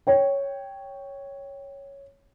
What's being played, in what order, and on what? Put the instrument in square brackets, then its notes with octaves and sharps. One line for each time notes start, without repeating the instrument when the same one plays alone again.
[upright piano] C#5 G5